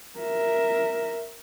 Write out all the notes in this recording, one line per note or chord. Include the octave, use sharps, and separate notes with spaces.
A#4 E5